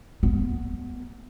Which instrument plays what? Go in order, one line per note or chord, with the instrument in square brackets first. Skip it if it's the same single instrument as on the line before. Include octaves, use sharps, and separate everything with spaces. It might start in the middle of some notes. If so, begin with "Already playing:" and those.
[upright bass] B3